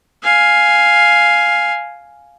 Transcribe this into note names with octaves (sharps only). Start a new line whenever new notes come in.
F5 G#5